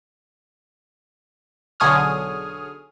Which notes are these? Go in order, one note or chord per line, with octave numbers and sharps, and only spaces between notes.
B1 D3 G#4 C#5 D#6 F6